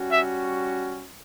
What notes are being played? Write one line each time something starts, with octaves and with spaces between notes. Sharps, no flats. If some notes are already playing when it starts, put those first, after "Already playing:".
Already playing: G3 C#4 F#4
E5